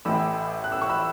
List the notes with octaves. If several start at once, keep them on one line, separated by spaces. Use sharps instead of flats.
A1 A2 E3 B5 E6
F#6
E6
C#6
B5 E6